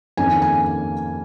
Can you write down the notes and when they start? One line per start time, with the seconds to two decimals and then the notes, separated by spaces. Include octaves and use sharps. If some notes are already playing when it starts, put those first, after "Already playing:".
0.17 F2 D#3 A#3 C#4 G#5
0.42 G#5